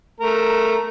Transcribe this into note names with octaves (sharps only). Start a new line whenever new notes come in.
A3 A#4